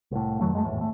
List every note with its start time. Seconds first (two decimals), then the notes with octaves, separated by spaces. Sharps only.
0.11 C2 A2
0.41 F2 D#3 F#3 A3
0.53 F#2 G#3 A3
0.65 G#1 E2 A2
0.80 G#1 A3